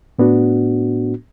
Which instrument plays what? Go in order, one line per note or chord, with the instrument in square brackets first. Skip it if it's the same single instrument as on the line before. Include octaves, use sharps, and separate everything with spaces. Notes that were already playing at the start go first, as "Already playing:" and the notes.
[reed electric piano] A2 B3 D4 F#4